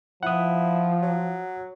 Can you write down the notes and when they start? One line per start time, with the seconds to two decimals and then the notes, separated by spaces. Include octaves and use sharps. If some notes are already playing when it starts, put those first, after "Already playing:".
0.23 F3 E4 F#5 D#6
1.02 F#3